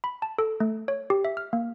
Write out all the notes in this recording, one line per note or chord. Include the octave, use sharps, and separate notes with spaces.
B5
A5
A4
A3
C#5
G4
E5
F6
A#3